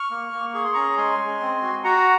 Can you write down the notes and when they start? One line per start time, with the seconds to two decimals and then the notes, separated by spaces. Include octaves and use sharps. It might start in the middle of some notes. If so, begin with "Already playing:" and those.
Already playing: C#6 F6
0.11 A#3
0.33 A#3
0.54 G#4 C#6
0.64 C6
0.74 C#4 A#5 C#6
0.97 G#3 G#5 C6
1.19 G#3
1.41 C4
1.62 F#4
1.84 F#4 F#5 A#5